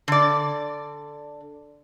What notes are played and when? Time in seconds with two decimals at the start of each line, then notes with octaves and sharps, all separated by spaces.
0.08 D3 D5